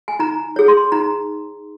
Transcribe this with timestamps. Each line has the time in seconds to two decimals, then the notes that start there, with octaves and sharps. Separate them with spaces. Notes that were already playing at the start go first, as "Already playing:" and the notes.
0.08 G#5
0.19 D#4 A#5
0.56 G#4 C#5
0.68 C6
0.92 D#4 A#5